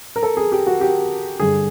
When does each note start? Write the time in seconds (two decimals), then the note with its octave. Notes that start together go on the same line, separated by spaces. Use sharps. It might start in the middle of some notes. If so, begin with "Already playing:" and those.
0.16 A#4
0.23 A4
0.37 G#4
0.52 G4
0.67 F#4
0.81 G4
1.40 G2 D3 G#4